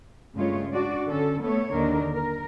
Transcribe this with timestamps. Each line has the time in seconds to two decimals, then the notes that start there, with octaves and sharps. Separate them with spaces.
0.34 G2 C#3 G#3 A3 F4 C#5
0.71 D4 F#4 D5
1.07 D3 C#4 A4
1.40 A3 B3 A4 C#5
1.71 D#2 D3 D#3 D4 A#4
2.11 A#4